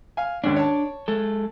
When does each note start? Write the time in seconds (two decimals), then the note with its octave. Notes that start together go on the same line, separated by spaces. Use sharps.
0.17 F5 G#5
0.44 D#2 G#2 C#4 D4
0.56 C#5 A5
1.08 G#3 A4